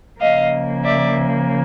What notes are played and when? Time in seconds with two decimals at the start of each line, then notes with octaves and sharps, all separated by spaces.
0.20 C#3 F3 A#3 D#5 F5
0.84 D5 E5